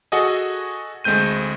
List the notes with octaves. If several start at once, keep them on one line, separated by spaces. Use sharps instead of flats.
F#4 G#4 A4 D#5 F#5 G#5
D2 G#3 A3 C4 G6 D#7